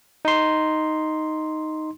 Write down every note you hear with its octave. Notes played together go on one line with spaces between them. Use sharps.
D#4 C6